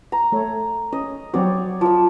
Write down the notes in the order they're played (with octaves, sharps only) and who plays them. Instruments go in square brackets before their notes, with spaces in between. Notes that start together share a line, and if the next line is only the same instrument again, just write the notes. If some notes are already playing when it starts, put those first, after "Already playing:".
[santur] A#5
[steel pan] A3 A4 C#5
[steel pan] C#4 [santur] D#5
[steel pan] F#3 C4 F#4 [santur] C#5 D5
[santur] F3 E6